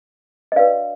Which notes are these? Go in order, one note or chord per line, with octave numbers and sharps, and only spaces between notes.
D#5
D4 F#4 B4 D5 F5